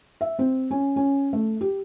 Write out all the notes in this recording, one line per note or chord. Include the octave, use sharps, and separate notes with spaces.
E5
C4
C#4
C#4
A3
G4